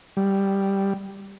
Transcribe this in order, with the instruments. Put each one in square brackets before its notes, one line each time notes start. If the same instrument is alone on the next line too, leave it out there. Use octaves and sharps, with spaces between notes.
[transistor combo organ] G3